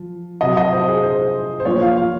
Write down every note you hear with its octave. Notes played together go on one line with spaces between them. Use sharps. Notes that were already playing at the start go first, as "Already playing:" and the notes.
Already playing: F3
C3 F#3 D#5
D#5
C5
G#4
C5
C5
A#2 F3 C#5
F5
F5